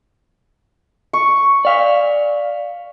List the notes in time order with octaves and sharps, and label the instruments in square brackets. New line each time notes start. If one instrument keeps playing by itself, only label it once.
[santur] C#6
[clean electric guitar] D5 F5